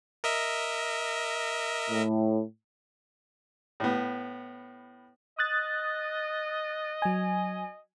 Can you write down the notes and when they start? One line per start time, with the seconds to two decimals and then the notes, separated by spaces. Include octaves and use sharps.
0.24 A#4 D#5 E5
1.90 A2
3.80 A2 B3
5.39 D#5 D#6 F#6 A6
7.02 F#3 G#5